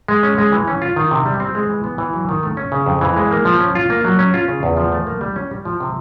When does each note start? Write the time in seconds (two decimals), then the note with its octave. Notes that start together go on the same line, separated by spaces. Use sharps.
0.08 G#3
0.23 C#4
0.38 G#3
0.52 E3
0.68 C#4
0.82 F4
0.96 D#3
1.11 C3
1.25 G3
1.40 C4
1.55 G#3
1.70 E3
1.84 B3
1.98 E3
2.14 F#3
2.29 D#3
2.43 A3
2.57 C#4
2.72 C#3
2.86 F2
3.01 E3
3.16 G#3
3.31 A#3
3.45 F3
3.60 C#4
3.75 F4
3.90 A#3
4.05 F#3
4.19 C#4
4.34 F4
4.49 C#3
4.63 E2
4.77 F3
4.92 A3
5.07 A#3
5.21 G3
5.36 C#4
5.51 G3
5.65 F3
5.80 C3